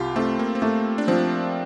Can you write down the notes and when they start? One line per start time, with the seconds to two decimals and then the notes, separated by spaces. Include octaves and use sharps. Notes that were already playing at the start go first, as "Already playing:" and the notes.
Already playing: C2 F4 G4
0.16 A3 C4
0.39 A#3
0.55 C4
0.62 A3 A#3
0.98 D4
1.08 F3 C4